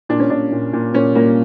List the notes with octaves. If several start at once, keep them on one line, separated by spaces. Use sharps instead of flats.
A#2 D4
C#4
A#2 D4
A#2
A#2
A#2 C#4
A#2 A#3